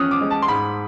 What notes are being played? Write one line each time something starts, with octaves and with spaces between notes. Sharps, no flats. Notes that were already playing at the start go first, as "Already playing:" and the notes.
Already playing: F3 C#4 D#6 F6 F#6
D6
G#3
A5
C6
G#2 B5